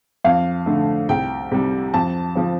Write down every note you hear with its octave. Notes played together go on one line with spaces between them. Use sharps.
F2 F5
D3 A3
C2 G5
C3 G3
F2 A5
F3 C4